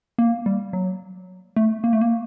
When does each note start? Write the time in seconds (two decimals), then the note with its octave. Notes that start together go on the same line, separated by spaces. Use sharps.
0.18 A#3
0.46 G3
0.73 F#3
1.56 A3
1.84 A#3
1.93 A3
2.01 A#3